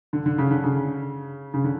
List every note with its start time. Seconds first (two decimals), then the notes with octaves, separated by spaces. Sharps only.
0.13 D3
0.26 D3
0.38 C#3
0.51 D3
0.64 C#3
1.54 C#3
1.64 D3